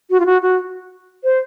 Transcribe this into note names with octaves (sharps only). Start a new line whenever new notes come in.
F#4
F4
F#4
F#4
C5